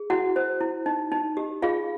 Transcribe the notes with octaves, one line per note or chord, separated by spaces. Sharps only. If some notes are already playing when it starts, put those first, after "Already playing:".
Already playing: G#4
E4 F#4 F#5
C5
E4
D#4
D#4
G4
F4 G#4 F5